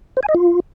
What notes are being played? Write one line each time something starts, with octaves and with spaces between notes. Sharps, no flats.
C5
G#5
D#5
F4